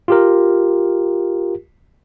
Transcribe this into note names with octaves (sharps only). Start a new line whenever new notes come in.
F4 G4 A#4